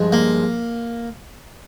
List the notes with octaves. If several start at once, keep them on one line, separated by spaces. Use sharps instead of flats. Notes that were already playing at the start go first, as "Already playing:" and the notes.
Already playing: G2 F3 G#3
A#3